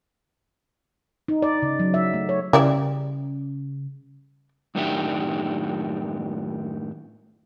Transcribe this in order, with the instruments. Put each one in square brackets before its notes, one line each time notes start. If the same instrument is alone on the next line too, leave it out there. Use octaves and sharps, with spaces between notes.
[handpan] D#4
D5
C#3
F#3
E5
A3
C#5
[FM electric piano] C#3 [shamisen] G3 E4 D5
[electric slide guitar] F#2 A2 D#3 D4 G4 E5